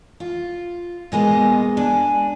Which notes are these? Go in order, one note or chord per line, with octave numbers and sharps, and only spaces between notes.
F4
B2 G#3 A#3 B3
D4 G#5